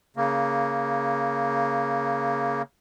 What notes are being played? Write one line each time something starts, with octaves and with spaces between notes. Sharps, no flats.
C#3 A#3